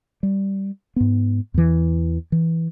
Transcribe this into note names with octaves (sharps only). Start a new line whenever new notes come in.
G3
G#2 B3
E2 E3
E3